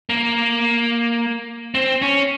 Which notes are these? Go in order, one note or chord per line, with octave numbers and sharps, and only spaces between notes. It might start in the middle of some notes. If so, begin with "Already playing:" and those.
A#3
C4
C#4